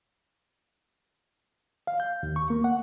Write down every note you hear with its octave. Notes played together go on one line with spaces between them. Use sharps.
F5
G6
D#2
C#6
A#3
F#5